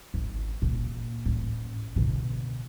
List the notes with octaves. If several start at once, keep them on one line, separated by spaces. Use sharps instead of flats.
G#1
A#2
A1 A2
B2 D3